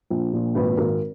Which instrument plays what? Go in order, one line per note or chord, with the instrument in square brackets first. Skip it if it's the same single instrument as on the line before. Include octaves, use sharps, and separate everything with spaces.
[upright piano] A#1
A#2
G#1 B4
G#1 A#4